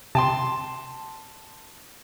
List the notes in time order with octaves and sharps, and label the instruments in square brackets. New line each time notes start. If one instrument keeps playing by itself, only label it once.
[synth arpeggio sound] C3 G5 [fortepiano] A5 C6